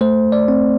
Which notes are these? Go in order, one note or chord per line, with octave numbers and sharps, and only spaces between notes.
A3 C5
D5
C4